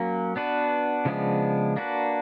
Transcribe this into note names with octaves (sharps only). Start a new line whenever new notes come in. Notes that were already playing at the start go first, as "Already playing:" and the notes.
Already playing: F#3 A#3 C#4
B3 D4 F#4 B4
C#3 F3 G#3 B3 D4
A#3 D4 F#4 B4